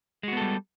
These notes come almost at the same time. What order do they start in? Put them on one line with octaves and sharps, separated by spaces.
G#3 F#4 B3 A4 G3